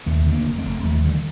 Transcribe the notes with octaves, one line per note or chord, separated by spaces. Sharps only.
D#2 A3 C4
D3
A#3 D4
F1
A3 C4
F1
D#2 F3 A3
D3 D#3 G3